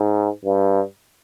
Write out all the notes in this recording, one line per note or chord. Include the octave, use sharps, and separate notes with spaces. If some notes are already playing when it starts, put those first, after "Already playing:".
Already playing: G#2
G2